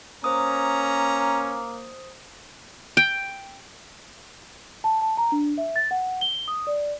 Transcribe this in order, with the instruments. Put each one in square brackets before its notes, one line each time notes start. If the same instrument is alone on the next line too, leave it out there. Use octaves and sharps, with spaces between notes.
[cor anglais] A#3 [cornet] C#4 [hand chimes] C5 D#6 [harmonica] A#5
[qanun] G5
[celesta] A5
A5
A#5
D4
E5
A6
F#5
G7
D#6
D5